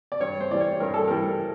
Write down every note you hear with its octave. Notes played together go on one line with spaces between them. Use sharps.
D5
G2 C#5
C5
E3 G3 D5
C#5
G2 A#4
A4
E3 G3 A#4